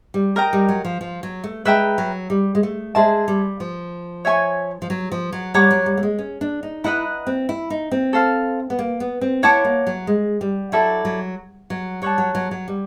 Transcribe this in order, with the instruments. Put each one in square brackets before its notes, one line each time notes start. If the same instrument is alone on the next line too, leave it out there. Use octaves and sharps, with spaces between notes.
[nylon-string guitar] G3
[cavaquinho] A#4 D#5 G5 A#5
[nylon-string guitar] G3
F#3
F3
F3
F#3
A3
[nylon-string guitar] G#3 [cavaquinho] B4 E5 G5 A#5
[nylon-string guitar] F#3
G3
G#3
A3
[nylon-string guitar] G#3 [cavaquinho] G#4 C5 E5 A5
[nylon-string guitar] G3
F3
[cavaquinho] C#5 E5 G#5 C#6
[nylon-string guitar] F3
F#3
F3
F#3
[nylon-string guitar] G3 [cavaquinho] C#5 F#5 A#5 D6
[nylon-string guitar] F#3
G3
A3
G#3
C#4
D4
D#4
[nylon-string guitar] E4 [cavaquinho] B4 D#5 F#5 A#5
[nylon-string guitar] C4
E4
D#4
C4
[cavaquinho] A4 C5 F5
[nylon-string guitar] B3
A#3
B3
C4
[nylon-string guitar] E4 [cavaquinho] C#5 F#5 A5 D6
[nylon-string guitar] A#3
F#3
G#3
G3
[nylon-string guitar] F#3 [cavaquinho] E4 A4 D5
[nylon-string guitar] F#3
F#3
[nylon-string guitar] G3 [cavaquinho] C#5 F#5 A5
[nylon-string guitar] F#3
F#3
F#3
G3